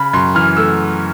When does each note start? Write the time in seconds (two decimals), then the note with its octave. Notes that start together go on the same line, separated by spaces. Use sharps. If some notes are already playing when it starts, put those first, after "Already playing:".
Already playing: C#3 B5
0.13 F#2 C6
0.35 E3 F6
0.57 A3 E6